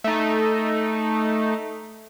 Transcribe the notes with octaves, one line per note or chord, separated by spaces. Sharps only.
A3 D#4